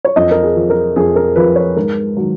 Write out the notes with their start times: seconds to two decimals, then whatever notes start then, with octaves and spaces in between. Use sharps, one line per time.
0.05 C#5
0.16 F2 D#5
0.31 A#4
0.43 G#4
0.56 F3
0.70 A#4
0.96 F2 G#4
1.16 A#4
1.36 F3 B4
1.56 C#5
1.76 G#2 A#4
2.17 D#3 F#3